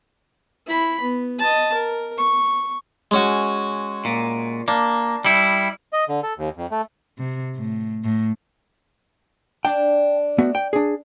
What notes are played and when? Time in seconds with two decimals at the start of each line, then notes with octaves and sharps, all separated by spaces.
0.66 E4 B5
1.00 B3
1.39 D#5 A5
1.74 A#4
2.18 C#6
3.11 G#3 C#4 F#4
4.05 A#2
4.68 A#3 D4
5.25 G3 E4
5.93 D#5
6.09 D3
6.23 A4
6.38 D#2
6.57 F2
6.71 A3
7.19 C3
7.55 A2
8.04 A2
9.65 D4 G5
10.38 A3 B3 F#4
10.55 G5
10.73 D4 G#4